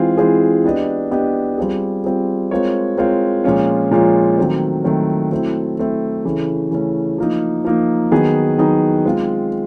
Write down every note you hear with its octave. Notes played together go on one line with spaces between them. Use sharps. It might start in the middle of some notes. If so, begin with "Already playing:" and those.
Already playing: E3 G#3 C4 F4 G#4
E3 G#3 C4 F4 G#4
B3 D4 G4 B4 D#5
B3 D4 G4 B4 D#5
G3 C4 F4 G#4
G3 C4 F4 G#4
G#3 C4 F4 A#4 C#5
G#3 C4 F4 A#4 C#5
A#2 F3 G#3 C#4 F4
A#2 F3 G#3 C#4 F4
D#3 F#3 A3 C4
D#3 F#3 A3 C4
F#3 A3 C4 E4
F#3 A3 C4 E4
C#3 E3 A3 C#4
C#3 E3 A3 C#4
F3 A#3 D#4
F3 A#3 D#4
D#3 F#3 B3 D#4 G#4
D#3 F#3 B3 D#4 G#4
G#3 C4 F4